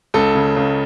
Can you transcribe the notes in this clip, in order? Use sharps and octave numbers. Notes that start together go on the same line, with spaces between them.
C#2 A4
C#3
C#2